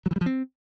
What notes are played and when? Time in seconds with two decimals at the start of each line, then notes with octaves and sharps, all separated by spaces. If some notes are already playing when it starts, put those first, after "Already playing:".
0.06 F#3
0.11 E3
0.16 G3
0.21 F3
0.26 C4